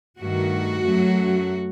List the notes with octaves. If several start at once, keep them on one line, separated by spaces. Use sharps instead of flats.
G2 D#3 A3 F#4
F#2 F#3 A3